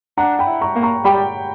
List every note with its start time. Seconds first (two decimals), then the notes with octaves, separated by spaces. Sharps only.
0.18 D4 F#5 A#5
0.39 G5 B5
0.47 E4
0.62 A#5 C#6
0.76 A#3
0.83 A#5 C#6
1.05 G3 G5 B5